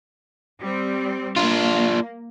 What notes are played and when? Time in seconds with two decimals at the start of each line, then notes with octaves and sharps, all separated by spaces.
0.60 G3 C4
1.36 A#3 D4 F4